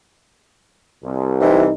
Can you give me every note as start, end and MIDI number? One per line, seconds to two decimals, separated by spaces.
1.04 1.72 36
1.41 1.65 48
1.41 1.65 52
1.41 1.73 63